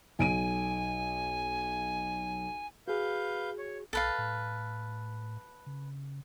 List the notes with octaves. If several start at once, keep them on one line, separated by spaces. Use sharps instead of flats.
B1 G#5 D7 D#7
F#4 G#4 B4 F5 G6
C#5
B1 A4 B4 F5
A2
C#3